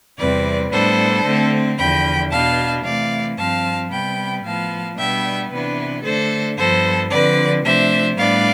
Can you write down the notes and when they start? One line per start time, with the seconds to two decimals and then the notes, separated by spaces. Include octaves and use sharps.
0.18 E2 C3 G3 C4 B4 D5
0.71 A2 G3 B3 D4 A4 C5
1.24 D3 A3 C4
1.78 E2 D3 F3 G5 B5
2.31 B2 B3 D4 F5 A5
2.84 C3 E3 A3 D5 F5
3.37 G2 F3 C4 F5 A5
3.90 C3 G3 B3 G5 B5
4.44 A2 F3 B3 F5 A5
4.97 B2 G3 B3 D4 E5 G5
5.50 C3 E3 B3 D4 B4
6.03 D3 A3 D4 A4 C5
6.57 G2 F3 B3 A4 C5
7.10 D3 F3 C4 B4 D5
7.64 C3 F3 A3 D4 C5 E5
8.17 A2 G3 B3 D4 D5 F5